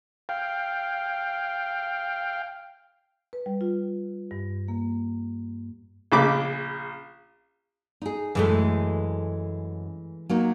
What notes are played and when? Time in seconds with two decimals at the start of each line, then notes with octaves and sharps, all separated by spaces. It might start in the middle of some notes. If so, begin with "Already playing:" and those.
0.29 F5 G5
3.33 B4
3.46 G3
3.61 F4
4.31 G2
4.68 A#3
6.12 A#1 C#3 B5 D6
8.02 D#4 G#4
8.35 F#2 E3 G#3 A3
10.29 F#3 A#3 D#4